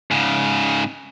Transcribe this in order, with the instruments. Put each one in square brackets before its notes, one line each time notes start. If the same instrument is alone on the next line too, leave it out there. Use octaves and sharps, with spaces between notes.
[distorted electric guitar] G#2 C#3